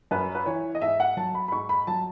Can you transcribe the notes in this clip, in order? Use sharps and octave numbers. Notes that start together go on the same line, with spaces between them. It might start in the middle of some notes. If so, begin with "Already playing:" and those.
F#2 B4
B4
E3 C#5
D#5
G#2 E5
F#5
F#3 A5
B5
B5
G#2 C#6
B5
F#3 A5